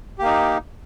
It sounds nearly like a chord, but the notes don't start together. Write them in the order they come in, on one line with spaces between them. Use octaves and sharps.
G4 A#3 D#4